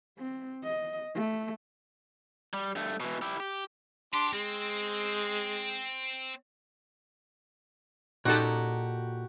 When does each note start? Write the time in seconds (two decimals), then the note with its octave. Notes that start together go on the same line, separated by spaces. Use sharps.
0.18 C4
0.64 D#5
1.15 A3
2.54 G3
2.76 G2 A3
3.00 B2 E3
3.22 E4 G4
3.40 G4
4.14 D4 G4 C6
4.33 G#3 C4
8.25 A#2 D#4 F#4 G4 A4